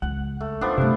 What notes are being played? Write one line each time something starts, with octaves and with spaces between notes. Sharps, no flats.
C#2 F4 F#5
A3
F3 B3 D4 D#4
G2 C3 A3